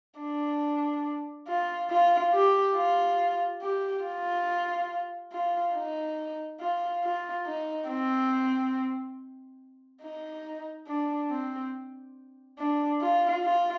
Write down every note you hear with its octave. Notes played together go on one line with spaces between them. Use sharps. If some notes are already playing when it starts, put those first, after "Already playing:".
D4
F4
F4
G4
F4
G4
F4
F4
D#4
F4
F4
D#4
C4
D#4
D4
C4
D4
F4
F4